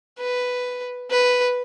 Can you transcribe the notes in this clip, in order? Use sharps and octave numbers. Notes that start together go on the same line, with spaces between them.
B4
B4